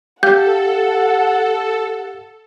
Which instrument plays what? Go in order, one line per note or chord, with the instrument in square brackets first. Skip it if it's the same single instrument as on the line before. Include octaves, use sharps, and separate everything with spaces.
[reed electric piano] G4 F5 [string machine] A4 [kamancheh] F#5 [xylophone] G6